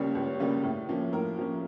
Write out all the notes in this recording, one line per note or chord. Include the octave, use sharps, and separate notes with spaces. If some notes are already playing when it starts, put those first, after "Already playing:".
Already playing: C#2 C#3 G3 A#3 C#4 C#5
C#2
C#3 G3 A#3 C#4
A2
F3 A#3 C#4
A2 A#4
F3 A#3 C#4